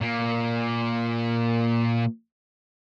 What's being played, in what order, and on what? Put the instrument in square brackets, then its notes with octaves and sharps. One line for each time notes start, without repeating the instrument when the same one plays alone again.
[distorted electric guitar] A#2 A#3